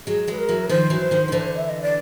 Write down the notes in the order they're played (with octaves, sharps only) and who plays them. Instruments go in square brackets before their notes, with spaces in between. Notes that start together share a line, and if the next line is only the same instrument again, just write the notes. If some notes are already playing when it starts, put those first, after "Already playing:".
[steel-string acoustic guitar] F#3 G#3 [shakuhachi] G#4
[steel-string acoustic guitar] F#3 G#3 [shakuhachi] B4
[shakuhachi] A#4
[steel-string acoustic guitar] E3 F#3
[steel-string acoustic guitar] D#3 F3 [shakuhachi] C5
[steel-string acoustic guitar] E3 F#3
D#3 F3
D#3
D3 E3
[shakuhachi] E5
D#5
D5